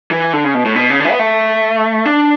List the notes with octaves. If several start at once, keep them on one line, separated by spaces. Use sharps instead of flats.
E3
D3
C#3
B2
A2
B2
C#3
D3
E3
B3
A3
D4